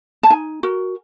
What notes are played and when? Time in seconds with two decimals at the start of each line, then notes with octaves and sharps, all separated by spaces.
0.23 A5
0.30 D#4 G#5
0.63 F#4 A#4